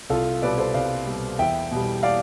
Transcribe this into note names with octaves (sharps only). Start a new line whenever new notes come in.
C2 F4 A4
B2 G3 B4 D5
A4 C5
C2 D5 F5
B2 G3
E2 E5 G5
B2 G3
D5 F5